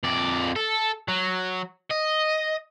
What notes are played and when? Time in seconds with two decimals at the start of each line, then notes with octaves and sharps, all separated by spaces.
0.03 F2 D5
0.56 A4
1.08 F#3
1.90 D#5